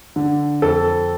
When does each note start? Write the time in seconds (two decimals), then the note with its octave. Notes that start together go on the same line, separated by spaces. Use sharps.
0.16 D3
0.62 F2 A4